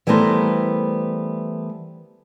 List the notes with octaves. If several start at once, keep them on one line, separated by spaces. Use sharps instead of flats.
E3 G3 A3 B3 A#4 C5